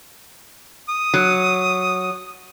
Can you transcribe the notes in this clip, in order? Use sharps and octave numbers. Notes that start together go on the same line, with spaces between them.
D#6
F#3